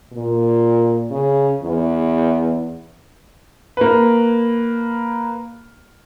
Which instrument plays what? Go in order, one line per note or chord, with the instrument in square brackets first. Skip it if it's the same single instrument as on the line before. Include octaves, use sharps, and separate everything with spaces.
[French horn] A#2
C#3
E2
[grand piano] A#3 B4